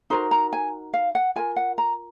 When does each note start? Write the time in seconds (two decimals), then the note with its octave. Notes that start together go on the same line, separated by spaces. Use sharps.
0.10 D#4 F#4 A#4 C5
0.31 A#5
0.53 G#5
0.94 F5
1.15 F#5
1.36 F4 A#4 G#5
1.56 F#5
1.78 A#5